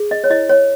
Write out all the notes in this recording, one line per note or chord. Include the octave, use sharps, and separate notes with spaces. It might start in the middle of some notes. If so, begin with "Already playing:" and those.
Already playing: G#4
D#5
C#5
E4 D#5
C#5